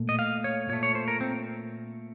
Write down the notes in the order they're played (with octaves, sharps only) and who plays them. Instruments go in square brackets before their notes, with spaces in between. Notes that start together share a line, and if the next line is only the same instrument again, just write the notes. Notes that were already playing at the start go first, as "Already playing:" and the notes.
Already playing: [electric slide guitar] A#2 A3
D#5
F5
C#5
A#2 A3 C#5
C#5
C5
A#4
C4